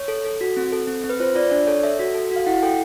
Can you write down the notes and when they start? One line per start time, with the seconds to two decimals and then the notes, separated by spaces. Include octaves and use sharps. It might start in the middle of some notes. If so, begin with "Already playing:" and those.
Already playing: C#5
0.08 A4
0.25 A4
0.41 F#4
0.57 C4
0.72 A4
0.87 C4
1.04 C4
1.09 B4
1.20 F4 C5
1.35 F4 D5
1.51 D4 D5
1.67 A4 C#5
1.83 A4 E5
1.99 F#4
2.14 A4
2.31 F#4
2.36 F5
2.47 E4 F#5
2.63 A4 G5